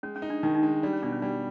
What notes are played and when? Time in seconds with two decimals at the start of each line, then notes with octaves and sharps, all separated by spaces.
0.03 G#3 C#4
0.16 C#4
0.22 D#4
0.30 D4
0.43 D#3 D#4
0.55 D#4
0.63 G#3 D4
0.83 G3 D4
0.93 C#4
1.03 B2 D4
1.12 C#4
1.22 G3 D4